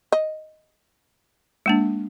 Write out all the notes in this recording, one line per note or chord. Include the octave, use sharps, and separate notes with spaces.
D#5
G#3 A#3 D4